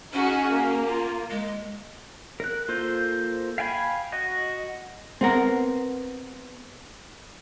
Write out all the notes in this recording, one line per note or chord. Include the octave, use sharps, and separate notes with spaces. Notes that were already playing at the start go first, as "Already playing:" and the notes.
C#4 D#4 F#4 G#4
A#3
F4
G#3
A#4 F#6
A#3 F4 A4 C5
F5 G5 G#5 B5
F#4 D#5
B3 C4 A#4 F#5